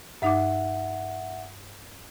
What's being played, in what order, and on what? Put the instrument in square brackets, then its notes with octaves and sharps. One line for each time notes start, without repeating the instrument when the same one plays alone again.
[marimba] G2 D#4 D6 [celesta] E5 F#5